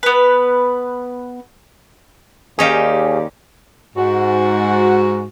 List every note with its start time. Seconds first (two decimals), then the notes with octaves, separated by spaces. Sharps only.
0.03 B3 B4
2.59 D#2 C#4 D#4 G4 G#4 D5 F5
3.96 G#2 F#4